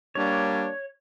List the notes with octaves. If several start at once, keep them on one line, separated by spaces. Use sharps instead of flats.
G3 A#3 D4 C#5